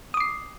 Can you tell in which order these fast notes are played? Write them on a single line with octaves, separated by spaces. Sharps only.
D#6 D6 C7